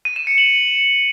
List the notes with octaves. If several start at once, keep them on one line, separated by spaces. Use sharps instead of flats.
D#7
E7
C#7
F#7